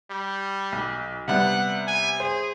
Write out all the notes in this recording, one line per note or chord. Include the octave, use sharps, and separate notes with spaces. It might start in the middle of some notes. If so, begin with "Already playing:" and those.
G3
B1
C3 G3 B3 F#5
G#5
G#4 C5